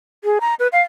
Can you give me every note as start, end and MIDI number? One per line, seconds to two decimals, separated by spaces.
0.24 0.39 68
0.41 0.54 82
0.59 0.68 71
0.72 0.82 77